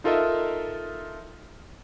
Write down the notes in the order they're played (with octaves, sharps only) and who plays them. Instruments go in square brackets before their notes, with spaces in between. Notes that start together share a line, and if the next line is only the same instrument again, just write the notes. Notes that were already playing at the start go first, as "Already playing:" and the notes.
[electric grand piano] D#4 F4 A4 A#4 D#5 E5